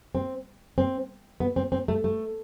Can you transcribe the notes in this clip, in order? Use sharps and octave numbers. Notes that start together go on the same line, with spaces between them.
C4
C4
B3
C4
C4
A3
A3